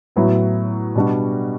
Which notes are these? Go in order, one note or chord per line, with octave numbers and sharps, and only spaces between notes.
A2 F#3 B3 E4
B2 G3 D4 F#4